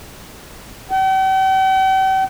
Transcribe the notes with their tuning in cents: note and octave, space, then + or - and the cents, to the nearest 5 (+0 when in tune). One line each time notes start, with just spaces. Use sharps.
G5 -45